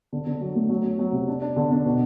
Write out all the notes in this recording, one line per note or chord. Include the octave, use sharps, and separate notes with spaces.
D3
D3
F#3
A3
F#3
F#3
F#3
C3
D4
D4
D3
D4
B2